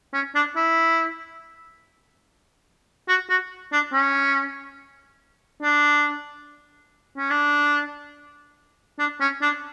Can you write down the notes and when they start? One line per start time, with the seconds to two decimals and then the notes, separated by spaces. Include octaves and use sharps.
0.14 C#4
0.35 D4
0.56 E4
3.09 F#4
3.30 F#4
3.73 D4
3.93 C#4
5.63 D4
7.17 C#4
7.30 D4
8.99 D4
9.21 C#4
9.42 D4